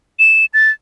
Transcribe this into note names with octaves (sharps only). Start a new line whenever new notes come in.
E7
A6